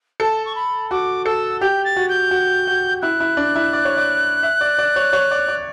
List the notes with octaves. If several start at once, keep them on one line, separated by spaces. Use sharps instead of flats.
A4 A5
C#6
B5
F#4 D6
A4 E6
G4 G6
A6
F#4
G6
F#4
F#4
E4 F#6
E4
D4
E4
D5
C#5
D5
E5
D5
D5
C#5
C#5
D5
D5